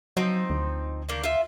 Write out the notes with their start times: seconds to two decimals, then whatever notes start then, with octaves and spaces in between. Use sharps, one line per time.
0.17 F3 F#3 C4 D#4
0.50 D2
1.09 D#3 A#3 D4
1.24 F4 E5